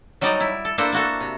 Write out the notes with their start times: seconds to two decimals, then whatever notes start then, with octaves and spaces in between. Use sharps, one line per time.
0.21 F#3 G3 D#4 D5 D#5 A#5
0.40 E4
0.65 A4
0.78 A#3 D4 E4 A4 A#4 C5
0.93 A#3 F#4 A4
1.20 C3